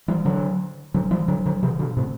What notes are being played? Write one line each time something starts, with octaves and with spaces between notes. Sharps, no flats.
E3 G3
D3 F#3
D3 F#3
E3 G3
D3 F#3
D3 F#3
C3 E3
B2 D3
A2 C3